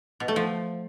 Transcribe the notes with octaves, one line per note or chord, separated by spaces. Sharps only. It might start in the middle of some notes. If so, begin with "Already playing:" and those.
B2
A3
F3